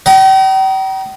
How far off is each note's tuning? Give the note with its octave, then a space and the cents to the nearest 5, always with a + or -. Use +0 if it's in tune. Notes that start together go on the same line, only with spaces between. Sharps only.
D#5 +0 G5 -40 A#5 +40